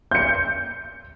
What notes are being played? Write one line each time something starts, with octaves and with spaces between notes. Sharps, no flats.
G6 C#7